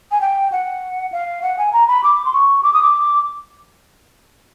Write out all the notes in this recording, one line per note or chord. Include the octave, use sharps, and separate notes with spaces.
G#5
G5
F#5
F5
F#5
G#5
A#5
B5
D6
C6
C#6
D6
D#6
D6